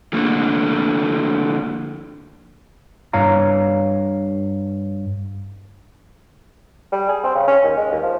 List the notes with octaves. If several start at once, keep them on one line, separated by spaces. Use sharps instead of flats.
D3 F3 A3 A#3
G2 C#5 F5 A#5
G3
G#4
C4
C#3
C#4
D#2
G#3
D#2
F3